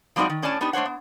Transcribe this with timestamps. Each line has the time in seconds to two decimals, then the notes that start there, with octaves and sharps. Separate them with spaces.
0.16 F3 G3 C4 D#4 F#4 D5
0.30 D#3
0.42 A2 C#4 D4 D5 A5
0.61 B3 D4 D#4 G4
0.73 A3 D4 C5 C#5 F#5
0.86 B3